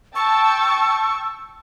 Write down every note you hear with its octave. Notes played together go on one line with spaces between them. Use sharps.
G5 A5 C#6 E6